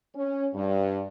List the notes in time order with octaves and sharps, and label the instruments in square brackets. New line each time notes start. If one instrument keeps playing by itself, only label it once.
[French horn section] C#4
G2